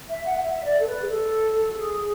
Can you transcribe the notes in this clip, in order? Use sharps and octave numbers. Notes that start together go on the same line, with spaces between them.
E5
F#5
F#5
E5
D5
A4
B4
G#4
A4
F#4
G#4